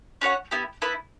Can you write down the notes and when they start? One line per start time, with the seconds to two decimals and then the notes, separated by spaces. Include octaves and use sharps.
0.21 C#4 F#4 C#5 F#5
0.51 B3 E4 G4
0.82 B3 E4 B4